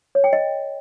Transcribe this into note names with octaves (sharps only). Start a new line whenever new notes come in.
C#5
G5
D#5